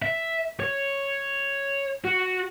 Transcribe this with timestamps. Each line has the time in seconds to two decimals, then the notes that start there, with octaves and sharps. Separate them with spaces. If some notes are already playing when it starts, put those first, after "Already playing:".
0.02 E5
0.60 C#5
2.04 F#4